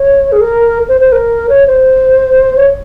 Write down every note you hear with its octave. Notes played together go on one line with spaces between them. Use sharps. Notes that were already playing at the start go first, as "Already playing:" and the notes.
Already playing: C#5
G#4
A#4
C5
C5
A#4
C#5
C5
C#5